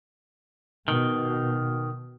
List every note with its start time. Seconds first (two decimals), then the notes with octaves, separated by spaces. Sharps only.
0.88 B2 D#3